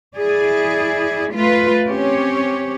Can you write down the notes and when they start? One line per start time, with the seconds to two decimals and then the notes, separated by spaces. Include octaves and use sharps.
0.16 E4 G#4 D5
1.33 A3 F4 B4
1.88 C4 C#4 G4 C#5